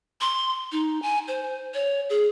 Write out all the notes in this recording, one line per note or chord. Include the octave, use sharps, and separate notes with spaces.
C6
D#4
G#5
C5
C#5
G#4